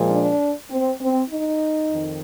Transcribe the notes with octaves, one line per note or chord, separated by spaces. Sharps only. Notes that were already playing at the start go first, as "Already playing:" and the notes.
Already playing: A#2 F3 G#3
D4
C4
C4
D#4
F2 D#3